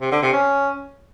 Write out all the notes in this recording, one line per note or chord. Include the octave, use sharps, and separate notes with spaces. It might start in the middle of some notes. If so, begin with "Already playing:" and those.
C3
D3
C3
C#4